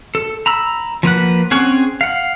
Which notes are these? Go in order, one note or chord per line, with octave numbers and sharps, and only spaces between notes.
A4
A#5 B5 E6
F3 A#3 B4 F#5
C4 C#4 G#4 F#5 C#6
F5 F#5